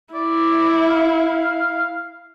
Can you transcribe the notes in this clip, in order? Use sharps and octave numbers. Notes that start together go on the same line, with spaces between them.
E4 D5
F5